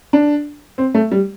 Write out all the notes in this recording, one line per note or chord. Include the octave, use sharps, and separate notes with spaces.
D4
C4
A3
G3